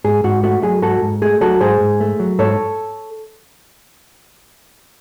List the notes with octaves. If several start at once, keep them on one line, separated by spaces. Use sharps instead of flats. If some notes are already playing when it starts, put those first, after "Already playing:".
G#2 G#4
G#2 F#4
A3 F#4
F#3 G#4
G#2 F#4 A4
G#2
A3 G#4
F#3 F#4 A4
G#2 G#4 C5
G#2
A3
F#3
G#2 A4 C#5